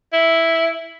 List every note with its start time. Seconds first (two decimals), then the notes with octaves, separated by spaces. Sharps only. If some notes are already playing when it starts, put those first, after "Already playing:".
0.13 E4